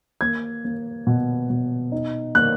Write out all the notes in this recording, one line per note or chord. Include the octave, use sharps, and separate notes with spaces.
A#3 G#6
A#3
B2
B2
D#4
A#3 F#6